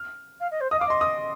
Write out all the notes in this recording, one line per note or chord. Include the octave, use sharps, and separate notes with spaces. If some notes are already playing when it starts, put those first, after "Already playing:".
Already playing: F6
F5
D#5
C5
D#5 D#6
F5 D6
D#5 C6
D#6